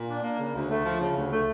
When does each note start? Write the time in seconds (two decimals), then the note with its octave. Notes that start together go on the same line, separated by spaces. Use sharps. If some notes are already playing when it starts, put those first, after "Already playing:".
Already playing: A#2
0.08 D4
0.23 A#3
0.39 C#3
0.55 D2
0.70 A3
0.85 F3
1.01 C#3
1.16 D2
1.32 A3